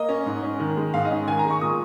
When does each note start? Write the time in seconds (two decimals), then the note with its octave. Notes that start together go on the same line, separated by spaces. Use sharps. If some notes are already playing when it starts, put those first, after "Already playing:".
Already playing: A#3 D#5
0.09 C#4
0.26 G#2
0.43 C#4
0.60 D#3
0.77 G#3
0.94 G#2 F5
1.05 D#5
1.11 C#4
1.27 D#3 G#5
1.39 A#5
1.45 G#3
1.51 C#6
1.61 A#2 D#6